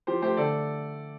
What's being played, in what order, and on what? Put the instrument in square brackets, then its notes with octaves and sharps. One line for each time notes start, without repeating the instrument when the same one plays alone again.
[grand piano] F3 G4 C5
A3 G4 C5
D3 A4 D5